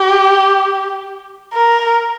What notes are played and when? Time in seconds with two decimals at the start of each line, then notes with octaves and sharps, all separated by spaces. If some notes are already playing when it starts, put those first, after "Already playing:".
Already playing: G4
1.54 A#4